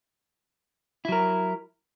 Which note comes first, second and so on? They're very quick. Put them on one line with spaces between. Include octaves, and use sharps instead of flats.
E4 F#3 A#4